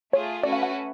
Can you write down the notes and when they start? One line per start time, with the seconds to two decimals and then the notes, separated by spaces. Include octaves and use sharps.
0.13 A3 F4 G#4 C#5
0.43 A3 C#4 F#4 B4 D5
0.53 F5
0.63 F#5